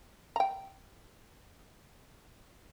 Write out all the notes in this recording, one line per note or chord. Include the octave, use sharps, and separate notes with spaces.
G5 A#5